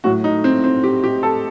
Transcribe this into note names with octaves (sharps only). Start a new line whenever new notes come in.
A2 F#3 A3 F#4
D#4
C4
C4
G4
G4
A4